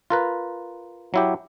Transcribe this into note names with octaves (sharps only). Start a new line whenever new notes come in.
F4 A#4 B4
F#3 E4 G4